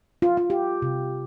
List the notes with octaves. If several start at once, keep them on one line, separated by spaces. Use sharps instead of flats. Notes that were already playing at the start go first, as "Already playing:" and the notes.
F4
F4
G4
C3